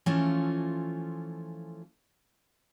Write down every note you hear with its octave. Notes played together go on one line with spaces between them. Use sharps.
E3 F3 A3 C#4 F4